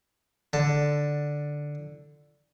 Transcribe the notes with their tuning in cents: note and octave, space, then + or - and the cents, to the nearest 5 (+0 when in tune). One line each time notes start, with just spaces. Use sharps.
D3 +0 A5 +10